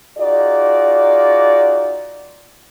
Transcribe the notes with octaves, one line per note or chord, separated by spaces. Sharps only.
D#4 F4 F#4 G#4 D5